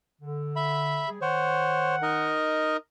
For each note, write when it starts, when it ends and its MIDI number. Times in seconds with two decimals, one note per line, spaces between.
0.21 1.03 50
0.56 1.09 76
0.56 1.09 83
1.08 1.18 55
1.08 1.18 68
1.22 2.35 51
1.22 1.96 72
1.22 1.96 73
1.22 2.35 78
2.02 2.77 63
2.02 2.77 70
2.02 2.77 75